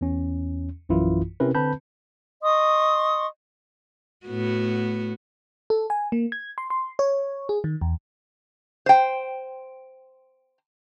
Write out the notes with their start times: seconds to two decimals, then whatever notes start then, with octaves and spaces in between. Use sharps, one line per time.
0.01 E2 C#4
0.89 A#1 F#2 E3 E4 F4
1.40 C3 C4 C#4 E4 A#4 B4
1.55 D3 C4 B4 A5 B5 G6
2.42 D#5 C6 C#6 D#6
4.27 A2 B3 F#4
5.70 A4
5.90 G#5
6.12 A#3
6.32 G#6
6.58 C6
6.70 C6
6.99 C#5
7.49 G#4
7.64 D#3
7.81 E2
8.86 C5 G5